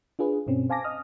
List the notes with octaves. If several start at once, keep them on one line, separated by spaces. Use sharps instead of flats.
D4 F4 G#4 B4
G2 B2 C4 C#4
C5 F5 G#5 A5 D6 A#6
D#5 D#6 F6